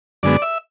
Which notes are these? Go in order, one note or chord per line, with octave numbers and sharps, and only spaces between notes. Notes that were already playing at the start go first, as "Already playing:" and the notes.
F#2 D3 G#3 B3 D5
E5